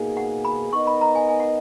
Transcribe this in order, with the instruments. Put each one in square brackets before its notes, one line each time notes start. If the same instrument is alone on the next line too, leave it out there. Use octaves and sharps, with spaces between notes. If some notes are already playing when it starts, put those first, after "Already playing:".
Already playing: [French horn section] B2 A#3 D#4 G#4
[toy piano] F#5
B5
[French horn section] B3 D#4 A#4 D#5 [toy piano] C#6
[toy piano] B5
A#5
G#5
G#5
F#5